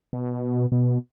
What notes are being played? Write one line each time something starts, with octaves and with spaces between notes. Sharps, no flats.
B2
B2